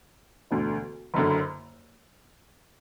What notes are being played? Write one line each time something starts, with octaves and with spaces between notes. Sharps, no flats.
E1 D2 D3
F#1 F#2 D3